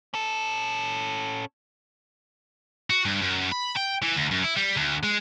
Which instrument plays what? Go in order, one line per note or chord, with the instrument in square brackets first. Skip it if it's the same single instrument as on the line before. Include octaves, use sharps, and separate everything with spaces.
[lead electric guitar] C#4 A4
[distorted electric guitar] F#4
G2
F#2
B5
G5
E3
D2
F#2
E4
G3
D2
G#3